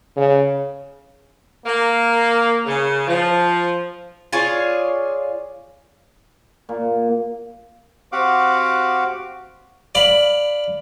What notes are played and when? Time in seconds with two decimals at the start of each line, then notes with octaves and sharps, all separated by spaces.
0.17 C#3
1.65 A#3
2.66 C#3
3.07 F3
4.32 F4 G#4 C#5 D5
6.69 A#2
8.12 C4 F#4 G4 F5 F#5 D6
9.95 D5 F5 B5